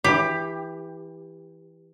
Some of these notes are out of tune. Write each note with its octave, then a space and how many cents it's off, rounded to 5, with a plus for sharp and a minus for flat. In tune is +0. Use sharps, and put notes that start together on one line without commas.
E3 +0 G4 +15